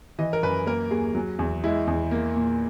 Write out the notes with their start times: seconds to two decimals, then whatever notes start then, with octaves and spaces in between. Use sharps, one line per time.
0.19 E3 D#5
0.33 A#4
0.43 F#2 B4
0.67 A#3 A#4
0.91 D#2 G#4
1.15 F#3
1.39 E2
1.64 G#3 E4
1.87 E2
2.11 A#3
2.36 A#2